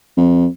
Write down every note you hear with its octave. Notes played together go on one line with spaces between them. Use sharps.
F2